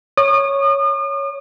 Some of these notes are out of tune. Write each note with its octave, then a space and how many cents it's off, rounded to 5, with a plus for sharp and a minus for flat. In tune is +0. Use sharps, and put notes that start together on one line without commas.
C#5 +0 D#6 -45